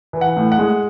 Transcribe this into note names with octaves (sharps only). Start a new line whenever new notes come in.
E3
F#5
A2
F#5
G#3